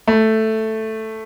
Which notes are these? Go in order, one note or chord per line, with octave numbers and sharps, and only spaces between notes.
A3